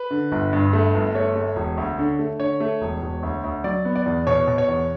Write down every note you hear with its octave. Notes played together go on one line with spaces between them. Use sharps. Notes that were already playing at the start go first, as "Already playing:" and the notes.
Already playing: B4
D3
G1
G2
A3
G1
A3 C#5
A3
E1
D2
D3
A3
D3 C#5
A3
E1
E1
D2
D2
F#3 D5
B3
D5
E2
B2 C#5
B2
C#5
E2